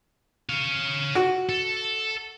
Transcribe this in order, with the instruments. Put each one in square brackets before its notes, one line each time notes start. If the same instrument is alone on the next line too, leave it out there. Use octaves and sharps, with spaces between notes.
[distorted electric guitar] C#5 F5
[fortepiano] F#4
[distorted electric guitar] A4